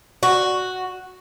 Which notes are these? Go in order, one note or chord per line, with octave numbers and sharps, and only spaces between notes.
F#4